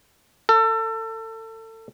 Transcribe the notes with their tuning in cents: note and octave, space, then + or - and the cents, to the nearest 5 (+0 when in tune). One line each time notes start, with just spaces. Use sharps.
A4 +30